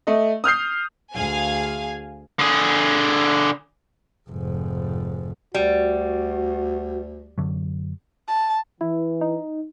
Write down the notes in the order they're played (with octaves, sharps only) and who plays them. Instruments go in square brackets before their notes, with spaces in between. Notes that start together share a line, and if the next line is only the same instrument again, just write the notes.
[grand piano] A3 D#5
D#6 F6 G6 C7
[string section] D2 G#4 F5 G#5
[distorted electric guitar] D3 G#4
[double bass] F1 G#2
[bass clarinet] D2 [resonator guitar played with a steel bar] G3 [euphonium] F#4
[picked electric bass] F#2 D3 F#3
[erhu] A5
[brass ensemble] E3 [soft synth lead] E4
[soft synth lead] D#4